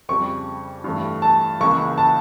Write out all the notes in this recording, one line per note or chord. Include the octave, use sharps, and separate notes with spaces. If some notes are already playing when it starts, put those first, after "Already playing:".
F2 C#3 G3 C#6
G2 E3 A3
A5
C#2 C#3 E3 A#3 C#6
A5